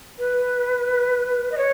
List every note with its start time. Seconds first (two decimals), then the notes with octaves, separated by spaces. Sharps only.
0.19 B4
1.52 D#5
1.58 C#5